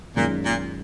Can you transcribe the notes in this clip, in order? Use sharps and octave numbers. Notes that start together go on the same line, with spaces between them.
F#2 A#2 D#3 G#3 C#4 F4
A#2